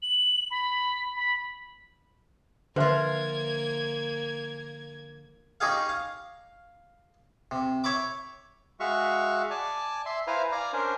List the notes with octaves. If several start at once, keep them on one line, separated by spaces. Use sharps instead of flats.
F#7
B5
B5
D3 F3 A#3 F4 B4 C5 E5 G#6
C#4 D#4 G4 G#4 F5
F5
C3
C#5 E5 B5 D6
G#3 F#4 E5 F5 C#6
D5 G#5 A5
E5 C6
E4 B4 C5 F5 G#5 A#5
D5 F5 G#5 A#5
C#4 D4 A#4 C5